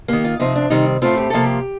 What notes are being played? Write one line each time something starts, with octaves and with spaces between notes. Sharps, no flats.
D#3 A#3 G4
F4
C3 F3 C4 D#4
D4
C3 D#3 G3 C4 D#4
A2 A3 C4 F4
G4
C3 F3 A#3 A4
G4